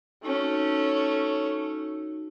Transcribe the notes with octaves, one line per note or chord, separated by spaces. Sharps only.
A3 C#4 D#4 F#4